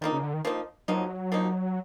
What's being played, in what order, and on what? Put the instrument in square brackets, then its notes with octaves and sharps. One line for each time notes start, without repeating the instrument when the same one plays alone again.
[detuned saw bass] D#3 [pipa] F3 A#3 D#4
[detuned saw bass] C#3
D3
D#3
[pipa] F3 A#3 D#4
[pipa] F3 A#3 D#4 [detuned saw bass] F#3
[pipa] F3 A#3 D#4